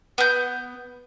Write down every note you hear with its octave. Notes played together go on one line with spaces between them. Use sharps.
B3 G6